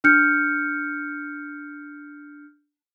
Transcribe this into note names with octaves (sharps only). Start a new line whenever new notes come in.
D4 F6 G6 C#7